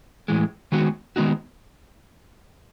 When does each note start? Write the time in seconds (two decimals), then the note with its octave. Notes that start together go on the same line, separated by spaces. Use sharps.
0.28 A2 E3 G#3
0.72 D#3 G#3 B3 D#4 F#4
1.16 D#3 G#3 B3 D#4 F#4